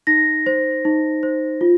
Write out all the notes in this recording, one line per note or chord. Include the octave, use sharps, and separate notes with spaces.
D#4 A#6
C5
D#4
C5
F4